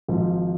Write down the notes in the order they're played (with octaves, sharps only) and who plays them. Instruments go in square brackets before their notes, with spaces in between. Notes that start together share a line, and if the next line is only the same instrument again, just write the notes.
[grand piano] G#1 G#2 F3